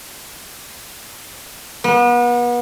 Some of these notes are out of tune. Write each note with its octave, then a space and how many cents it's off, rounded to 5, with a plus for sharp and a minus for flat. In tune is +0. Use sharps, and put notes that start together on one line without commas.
B3 -35